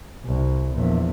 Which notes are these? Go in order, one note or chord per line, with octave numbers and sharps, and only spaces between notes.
C2
A#1 E2